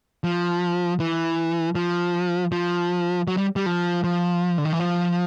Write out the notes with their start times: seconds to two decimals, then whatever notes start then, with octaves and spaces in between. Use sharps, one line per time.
0.24 F3
1.00 E3
1.75 F3
2.52 F3
3.28 F#3
3.37 G3
3.56 G3
3.66 F3
4.04 F3
4.58 D3
4.65 D#3
4.73 E3
4.79 F3